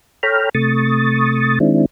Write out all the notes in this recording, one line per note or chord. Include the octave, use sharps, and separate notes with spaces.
A4 C#5 G5 A#5 B5 F6
C3 A3 C#6 D#6 A6
D#3 G#3 C4 D4 E4